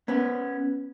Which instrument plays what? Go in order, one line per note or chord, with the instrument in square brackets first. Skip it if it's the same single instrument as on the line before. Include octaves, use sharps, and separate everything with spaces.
[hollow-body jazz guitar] B3 C#4